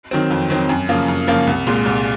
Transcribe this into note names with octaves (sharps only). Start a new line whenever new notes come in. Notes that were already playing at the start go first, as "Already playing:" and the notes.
D#3 F#3 C4
F2
D#3 F#3 C4
F#2
C#3 F3 A#3 F4
F#2
C#3 F3 A#3 F4
C2
A#2 G#3
C2